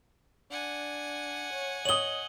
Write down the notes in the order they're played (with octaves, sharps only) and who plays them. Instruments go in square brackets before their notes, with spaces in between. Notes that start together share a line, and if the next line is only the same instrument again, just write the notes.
[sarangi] D4 [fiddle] F#5 G#5
[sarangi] C#5
[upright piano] C#5 D#6 [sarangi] D#5 [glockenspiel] F#7 G7